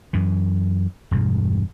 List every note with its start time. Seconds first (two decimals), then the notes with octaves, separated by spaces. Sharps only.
0.13 F#2 E3
1.11 E1 G2 B2